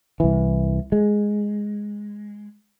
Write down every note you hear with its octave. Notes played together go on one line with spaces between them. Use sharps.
C2 E3
G#3